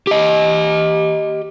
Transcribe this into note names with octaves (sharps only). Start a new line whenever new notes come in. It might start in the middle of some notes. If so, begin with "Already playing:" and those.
G4 D#5